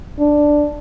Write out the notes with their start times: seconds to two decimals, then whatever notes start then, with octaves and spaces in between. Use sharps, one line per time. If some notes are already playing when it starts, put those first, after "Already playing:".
0.19 D4